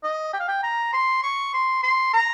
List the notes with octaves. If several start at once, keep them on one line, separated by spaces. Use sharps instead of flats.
D#5
G5
F5
G5
A#5
C6
C#6
C6
C6
A#5